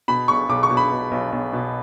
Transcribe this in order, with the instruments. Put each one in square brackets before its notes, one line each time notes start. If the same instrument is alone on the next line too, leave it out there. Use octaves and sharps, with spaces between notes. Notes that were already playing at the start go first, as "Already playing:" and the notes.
[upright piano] B2 B5
B1 C#6
B1 D6
C#6
B2
B5
B2
B1
B1
B2